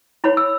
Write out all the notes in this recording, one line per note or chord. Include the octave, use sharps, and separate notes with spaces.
E4 C#5 B5
E6